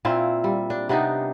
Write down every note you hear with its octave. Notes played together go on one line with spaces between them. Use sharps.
A#2 C4 E4 F4
G3
D4
C3 B3 D4 D#4